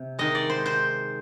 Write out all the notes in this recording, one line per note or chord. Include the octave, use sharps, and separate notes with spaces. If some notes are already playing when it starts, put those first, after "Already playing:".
Already playing: C3
D#3 G#3 D#5
D5
C5
C5